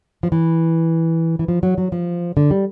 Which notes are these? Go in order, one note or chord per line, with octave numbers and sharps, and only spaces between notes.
F3
E3
E3
F3
F#3
F#3
F3
D3
G3